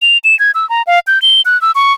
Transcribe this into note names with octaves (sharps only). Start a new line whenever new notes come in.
F7
E7
G#6
E6
A#5
F5
G6
G7
F#6
E6
C#6